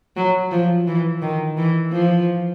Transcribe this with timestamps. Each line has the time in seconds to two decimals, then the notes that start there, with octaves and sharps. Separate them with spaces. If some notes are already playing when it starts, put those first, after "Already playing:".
0.16 F#3
0.52 F3
0.87 E3
1.22 D#3
1.57 E3
1.92 F3